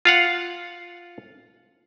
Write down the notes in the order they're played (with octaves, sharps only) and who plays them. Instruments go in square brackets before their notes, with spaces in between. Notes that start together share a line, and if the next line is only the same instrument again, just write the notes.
[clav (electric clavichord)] F4 F5 F#5